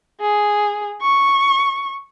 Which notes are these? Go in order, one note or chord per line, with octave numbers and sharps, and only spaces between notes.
G#4
C#6